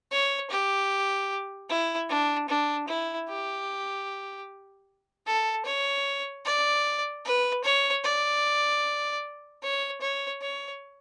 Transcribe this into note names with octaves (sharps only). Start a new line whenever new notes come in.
C#5
G4
E4
D4
D4
E4
G4
A4
C#5
D5
B4
C#5
D5
C#5
C#5
C#5